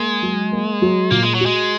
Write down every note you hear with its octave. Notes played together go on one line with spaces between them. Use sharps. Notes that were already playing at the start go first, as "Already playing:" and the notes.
Already playing: G#3 A#3
F#3
A#3
F#3
A#2 A#3
G#3
F#3
F#4
G#3